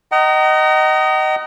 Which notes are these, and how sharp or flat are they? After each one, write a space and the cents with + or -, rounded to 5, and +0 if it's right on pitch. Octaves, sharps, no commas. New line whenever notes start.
D#5 +0 F#5 +45 A#5 -15